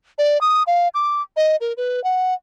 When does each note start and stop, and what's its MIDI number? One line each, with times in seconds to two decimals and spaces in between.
0.18 0.40 74
0.41 0.63 87
0.67 0.88 77
0.94 1.22 86
1.37 1.56 75
1.61 1.73 70
1.77 2.03 71
2.04 2.34 78